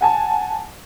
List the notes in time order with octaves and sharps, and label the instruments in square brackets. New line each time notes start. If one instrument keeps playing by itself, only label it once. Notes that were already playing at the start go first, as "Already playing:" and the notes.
[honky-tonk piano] F#5 G#5 A5